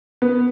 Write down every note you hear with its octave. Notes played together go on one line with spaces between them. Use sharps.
B3